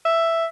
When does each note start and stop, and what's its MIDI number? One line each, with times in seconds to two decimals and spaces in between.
0.05 0.46 76